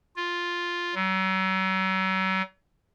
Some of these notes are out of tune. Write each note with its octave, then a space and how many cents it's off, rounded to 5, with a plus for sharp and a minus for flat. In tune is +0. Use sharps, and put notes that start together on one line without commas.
F4 +0
F#3 +40